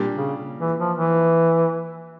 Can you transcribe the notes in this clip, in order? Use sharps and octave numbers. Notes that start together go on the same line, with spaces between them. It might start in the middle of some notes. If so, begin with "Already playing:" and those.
Already playing: A#2 G3 A#3 D4
C#3
E3
F3
E3